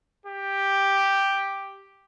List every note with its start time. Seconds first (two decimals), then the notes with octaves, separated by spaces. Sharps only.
0.26 G4